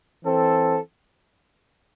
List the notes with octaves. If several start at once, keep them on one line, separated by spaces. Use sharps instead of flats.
E3 C4 A4